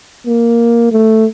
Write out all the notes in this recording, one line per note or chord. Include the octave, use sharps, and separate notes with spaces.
A#3
A3